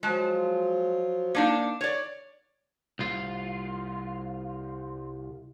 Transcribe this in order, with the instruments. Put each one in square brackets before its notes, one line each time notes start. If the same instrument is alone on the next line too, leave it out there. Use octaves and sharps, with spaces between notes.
[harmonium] F3 F#3 F4 [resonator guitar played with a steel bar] G#3 A5
[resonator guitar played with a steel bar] A#3 D4 D#4
C#5 D5
[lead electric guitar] C2 F4